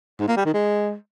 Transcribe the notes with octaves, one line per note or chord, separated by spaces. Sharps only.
G#2
A#3
G3
D#3
G#3